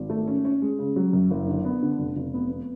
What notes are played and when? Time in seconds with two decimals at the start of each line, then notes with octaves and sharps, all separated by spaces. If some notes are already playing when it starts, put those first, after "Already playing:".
Already playing: G#1
0.10 A3
0.28 C#4
0.45 C#4
0.62 G#3
0.79 C#3
0.96 F#3
1.13 F#2
1.31 F#1
1.48 D3
1.65 B3
1.83 D3
1.99 F1
2.16 F1
2.34 B3
2.50 B3